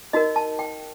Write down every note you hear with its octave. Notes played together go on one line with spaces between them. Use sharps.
D#4 F#4 A#4 D#5
A5
G5